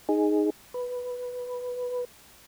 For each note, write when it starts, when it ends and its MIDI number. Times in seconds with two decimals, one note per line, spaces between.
0.09 0.50 63
0.09 0.50 68
0.74 2.05 71